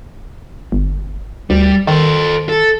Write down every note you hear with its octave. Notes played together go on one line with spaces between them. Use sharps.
G1
D2 G3
D#3 A4 C5
A4